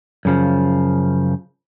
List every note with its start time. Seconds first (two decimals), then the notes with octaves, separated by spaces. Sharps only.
0.25 F#2 C#3 F3